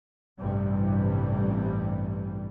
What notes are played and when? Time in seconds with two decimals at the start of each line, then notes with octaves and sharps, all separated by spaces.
0.40 A1 G2 C3 E3 G3